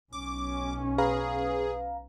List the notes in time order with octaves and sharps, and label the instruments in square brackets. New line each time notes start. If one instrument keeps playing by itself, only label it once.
[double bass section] B1 C#4 [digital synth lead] D6
[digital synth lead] G#4 [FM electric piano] B4 F5 A#5